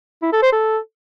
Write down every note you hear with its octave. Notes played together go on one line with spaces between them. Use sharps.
E4
A4
C5
A4